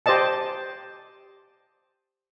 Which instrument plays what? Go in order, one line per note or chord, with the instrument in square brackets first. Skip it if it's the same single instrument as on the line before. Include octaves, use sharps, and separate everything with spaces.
[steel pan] G4 C5 D5 D#5 A5